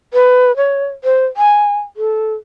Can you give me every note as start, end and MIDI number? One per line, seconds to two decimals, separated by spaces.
0.14 0.55 71
0.57 0.86 73
1.04 1.26 72
1.37 1.78 80
1.97 2.34 69